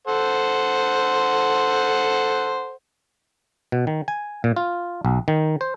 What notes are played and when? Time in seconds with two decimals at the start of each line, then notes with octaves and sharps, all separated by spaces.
0.08 A4 C5 F#5
3.72 B2
3.87 D#3
4.08 G#5
4.44 A#2
4.56 F4
5.05 B1
5.28 D#3
5.61 C5